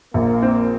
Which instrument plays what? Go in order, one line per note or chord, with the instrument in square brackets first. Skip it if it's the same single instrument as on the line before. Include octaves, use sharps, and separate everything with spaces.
[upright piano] A#1 [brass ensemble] A#3
[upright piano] C4